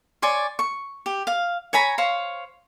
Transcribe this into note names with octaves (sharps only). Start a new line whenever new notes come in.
C#5 D5 G#5 C6
C#6
G4
F5
C#5 G#5 A#5 B5
C5 C#5 F5